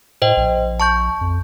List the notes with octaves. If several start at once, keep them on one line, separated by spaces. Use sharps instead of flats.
A2 C5 D#5 G5
A#1
A5 C#6 G6
F2